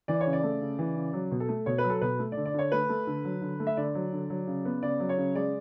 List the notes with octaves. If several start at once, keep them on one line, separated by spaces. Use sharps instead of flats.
E3 D5
C#5
C#3
D5
A3
C#3
E3
C#3
F#3
B2
A4
A3
B2 C#5
B4
F#3
A4
B2 B4
A3
D5
D3
D5
D3 C#5
A3 B4
A3
D3
F#3
D3
A3
E5
D3 D5
F#3
D3
F#3
C#3
B3
C#3 D5
F#3
C#5
C#3
G#3 D5